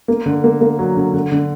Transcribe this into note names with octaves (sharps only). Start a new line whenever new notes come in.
A#3
D3
A#3
A#3
F#3
D3
D3
D3